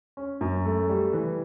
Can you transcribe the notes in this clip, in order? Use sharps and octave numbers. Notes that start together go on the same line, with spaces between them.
C#4
F#2
A3
G3
E3